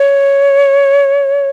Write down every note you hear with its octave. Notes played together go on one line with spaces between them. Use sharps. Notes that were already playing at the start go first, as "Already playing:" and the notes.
Already playing: C#5